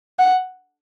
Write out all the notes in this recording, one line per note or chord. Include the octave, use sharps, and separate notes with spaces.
F#5